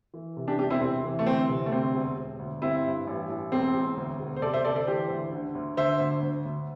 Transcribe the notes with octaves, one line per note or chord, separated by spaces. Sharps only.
E3
C3
D4 G4
E1 D4 G4
C4 E4
C3 C4
E3
A3
D2 C4
C3
A3
D2 C4
E1
E1
D2
G2 C4 E4
G2
A1
A1
E1 C4
E1
D2
E1
C5
C3 A4 D5
C5 E5
D2 A4 D5
A4 D5
E3 G4 C5
D2
D3
D2
D3 C5 E5
D2
D2
D2